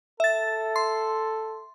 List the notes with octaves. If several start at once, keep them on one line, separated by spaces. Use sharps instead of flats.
A4 E5 A6
C6